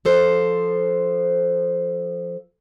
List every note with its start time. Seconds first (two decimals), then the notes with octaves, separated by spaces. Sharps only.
0.05 F3 A4 C5